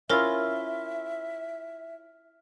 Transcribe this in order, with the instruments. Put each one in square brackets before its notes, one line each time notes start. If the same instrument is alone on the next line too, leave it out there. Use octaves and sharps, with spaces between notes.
[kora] C#4 E4 F4 [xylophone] A#4 C5 A#6 [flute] E5 [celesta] F6